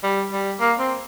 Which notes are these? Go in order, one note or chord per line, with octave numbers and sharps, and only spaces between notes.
G3
G3
A#3
C4